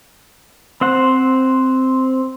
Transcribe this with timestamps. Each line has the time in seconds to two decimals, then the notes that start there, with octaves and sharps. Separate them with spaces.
0.81 C4 C5 F#5